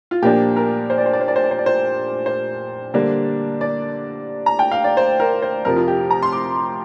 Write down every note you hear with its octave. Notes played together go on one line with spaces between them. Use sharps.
F4
A#2 F3 A#3 D4 G4
A#4
C5
D5
C5
D5
C5
D5
C5
D5
C5
D5
C5
C5
D3 G3 A#3 D4
D5
A#5
G5
F5
D5
C5
A#4
C5
F2 C3 F3 A#4
F4
G4
A#5
C6
D6